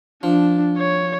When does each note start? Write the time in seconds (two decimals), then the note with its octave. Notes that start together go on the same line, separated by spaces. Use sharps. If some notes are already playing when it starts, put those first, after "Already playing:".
0.23 F3 D4
0.78 C#5